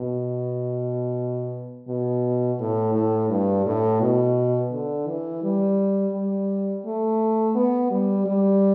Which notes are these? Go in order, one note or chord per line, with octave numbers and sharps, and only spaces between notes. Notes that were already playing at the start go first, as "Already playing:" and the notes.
Already playing: B2
B2
A2
A2
G2
A2
B2
D3
E3
G3
G3
A3
B3
G3
G3